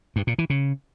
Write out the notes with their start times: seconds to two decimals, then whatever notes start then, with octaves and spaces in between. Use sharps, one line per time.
0.16 G2
0.27 A#2
0.38 E3
0.50 C#3